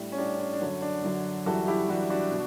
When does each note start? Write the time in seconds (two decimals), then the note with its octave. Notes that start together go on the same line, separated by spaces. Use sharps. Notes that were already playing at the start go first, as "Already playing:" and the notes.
Already playing: A2 G3 D4
0.12 C#4
0.18 A2 G3 D4
0.40 C#4
0.53 D4
0.60 F#2 D3 F#3 C#4
0.82 D4
1.03 F#2 D3 F#3
1.46 F#2 E3 G3 F#4 A4
1.67 E4 G4
1.89 F#2 E3 G3 D4 F#4
2.10 D4 F#4
2.32 B2